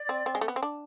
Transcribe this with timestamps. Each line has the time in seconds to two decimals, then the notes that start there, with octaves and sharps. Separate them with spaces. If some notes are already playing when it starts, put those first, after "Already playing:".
Already playing: D5
0.09 C4
0.26 C4
0.35 G#3
0.41 A3
0.48 B3
0.56 C4
0.63 D4